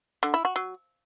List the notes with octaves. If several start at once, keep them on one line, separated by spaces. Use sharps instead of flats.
D3
E4
F#4
F#3